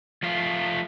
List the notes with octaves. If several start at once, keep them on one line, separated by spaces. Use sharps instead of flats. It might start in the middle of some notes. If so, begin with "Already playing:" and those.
F3 A3 F5